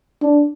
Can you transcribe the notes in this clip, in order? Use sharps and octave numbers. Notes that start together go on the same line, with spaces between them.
D4